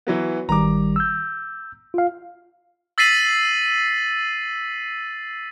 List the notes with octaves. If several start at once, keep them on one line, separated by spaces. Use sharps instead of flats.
E3 F#3 B3
G#1 D#3 G3 A#5 D6
E6 G6
F4 F5
E6 A6 B6 C7 D#7 F#7